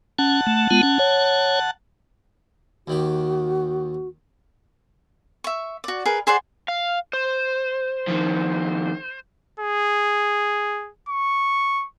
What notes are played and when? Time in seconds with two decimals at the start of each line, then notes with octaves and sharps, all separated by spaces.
0.19 C#4 F#5 A5
0.47 A3
0.71 G#3 B3 F4
0.83 C#4
0.99 C#5
2.87 D#2 D#3 F#4 G4
5.44 E5 C#6
5.84 F#4 D5
6.05 G#4 A#4 B4
6.27 G#4 C5 D5 F#5
6.68 F5
7.13 C5
8.08 F2 D#3
9.60 G#4
11.09 C#6